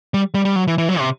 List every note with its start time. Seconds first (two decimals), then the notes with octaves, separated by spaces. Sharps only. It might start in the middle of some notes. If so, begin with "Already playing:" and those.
0.14 G3
0.35 G3
0.45 G3
0.56 F#3
0.67 E3
0.78 E3
0.89 F#3
0.99 C3